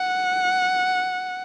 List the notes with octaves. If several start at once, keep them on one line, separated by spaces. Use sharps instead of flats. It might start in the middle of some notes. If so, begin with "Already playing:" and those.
Already playing: F#5